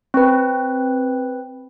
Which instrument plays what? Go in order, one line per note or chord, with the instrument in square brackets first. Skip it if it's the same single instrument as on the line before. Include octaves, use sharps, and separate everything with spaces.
[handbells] C4 B4